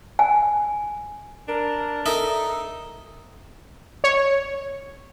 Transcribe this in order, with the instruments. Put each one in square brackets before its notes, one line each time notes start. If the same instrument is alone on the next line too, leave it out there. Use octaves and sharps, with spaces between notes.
[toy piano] G#5
[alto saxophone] D4 [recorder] A#4
[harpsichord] D#4 A#4 E5 [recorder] A4
[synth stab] C#5